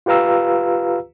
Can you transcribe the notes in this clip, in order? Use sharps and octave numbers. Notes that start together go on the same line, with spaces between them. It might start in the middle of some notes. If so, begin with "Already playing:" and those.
F4 G4 B4 F5 A#5 E6